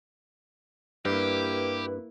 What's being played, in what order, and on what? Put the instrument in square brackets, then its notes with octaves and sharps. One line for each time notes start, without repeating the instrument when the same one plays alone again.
[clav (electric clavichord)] G2 [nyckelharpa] A#3 E4 [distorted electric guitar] G4 [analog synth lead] B4